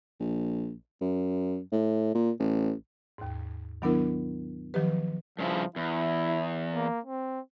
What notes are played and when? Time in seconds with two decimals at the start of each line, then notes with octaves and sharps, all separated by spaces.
0.20 A#1
1.01 F#2
1.72 A2
2.15 A#2
2.39 A1
3.18 D#2 G#2
3.82 D#3 F#3 B3 D4 E4 A#4
4.74 D#3 F3 F#3 G4 B4
5.39 G2 C#3 F3 E4
5.76 E2 E4
6.74 A#3
7.05 C4